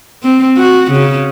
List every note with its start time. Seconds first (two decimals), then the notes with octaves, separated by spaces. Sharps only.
0.23 C4
0.58 F#4
0.92 C#3